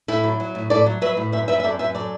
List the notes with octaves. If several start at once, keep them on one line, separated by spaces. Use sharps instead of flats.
A2 E4 A4
F#3
F#3
A2
A2 A4 D5
F#3
F#3 B4 E5
A2
F#2 B4 E5
F#2 B4 E5
E5
F#2 A4 D5
F#2 B4 E5
F#3 A4 D5